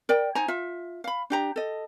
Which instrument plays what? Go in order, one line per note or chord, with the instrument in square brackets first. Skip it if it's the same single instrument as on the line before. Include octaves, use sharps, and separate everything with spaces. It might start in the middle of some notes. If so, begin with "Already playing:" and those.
[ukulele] A#4 D5 G5
D#4 C5 G#5 A#5
F4 E5
F5 B5
D4 G4 A#5
A4 D#5